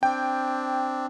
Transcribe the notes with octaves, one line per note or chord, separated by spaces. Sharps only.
C4 D4 G5